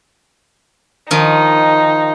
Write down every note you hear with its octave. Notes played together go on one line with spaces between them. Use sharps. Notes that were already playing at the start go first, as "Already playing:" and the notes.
D#3 F3 D#4